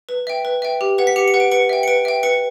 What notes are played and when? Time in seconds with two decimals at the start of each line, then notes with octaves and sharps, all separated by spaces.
0.09 B4
0.27 E5 G5
0.45 B4
0.62 E5 G5
0.81 G4
0.98 B4 F#5
1.07 B6
1.16 G4 C#7
1.28 C#7
1.34 B4 F#5
1.40 D7
1.51 B4 C#7
1.69 E5 G5
1.83 C#7
1.88 B4 D7
2.05 E5 G5
2.23 B4 C#7